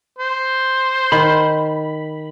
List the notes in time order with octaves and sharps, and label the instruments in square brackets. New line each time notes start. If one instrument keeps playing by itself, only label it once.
[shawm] C5
[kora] D#3 [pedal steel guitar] B5